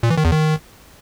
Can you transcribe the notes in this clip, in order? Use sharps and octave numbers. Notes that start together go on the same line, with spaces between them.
A#2
E3
D#3
E2
D#3